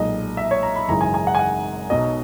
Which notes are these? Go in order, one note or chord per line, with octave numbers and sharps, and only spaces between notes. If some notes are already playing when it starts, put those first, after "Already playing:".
Already playing: B1 A#2 G#3 D#5
E5
C#5
A#5
B5
G#1 F#2 C#3 E3 G#3 A#5
G#5
G#5
F#5
G#5
F#5
B1 B2 F#3 D#5